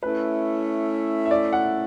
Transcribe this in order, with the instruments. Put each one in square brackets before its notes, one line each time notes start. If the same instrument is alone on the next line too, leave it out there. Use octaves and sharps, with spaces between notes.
[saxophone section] A3 C#4 E4 [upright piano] B4
[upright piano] E5
D5
F#5